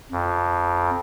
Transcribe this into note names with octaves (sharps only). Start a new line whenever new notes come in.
F2